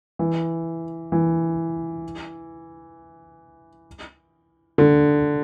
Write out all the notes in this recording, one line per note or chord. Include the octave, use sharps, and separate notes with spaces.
E3
E3
D3